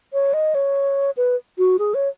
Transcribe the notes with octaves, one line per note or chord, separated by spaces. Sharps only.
C#5
D#5
C#5
B4
F#4
G#4
C#5